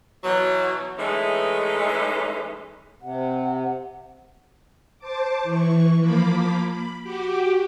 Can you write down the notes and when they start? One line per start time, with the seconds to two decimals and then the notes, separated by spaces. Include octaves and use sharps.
0.24 B2 E3 F#3
0.98 E3 G#3 A3 C#4 D#4
3.02 C3 F#5
4.99 C5 A5 D6
5.43 E3 C#6
5.98 F3 A#3 B5 D6
6.70 B5
7.03 F#4 G4 D6